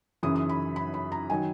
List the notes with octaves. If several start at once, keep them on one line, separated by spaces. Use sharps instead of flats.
F#2 C#3 E3 D#6
D#6
B5
B5
B5
A#5
D#3 F#3 G#5